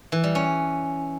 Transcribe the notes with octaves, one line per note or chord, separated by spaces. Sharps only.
E3
G3
C#4